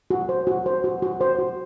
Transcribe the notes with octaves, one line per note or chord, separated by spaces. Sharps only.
F#4
C5
F#4
C5
F#4
F#4
C5
F#4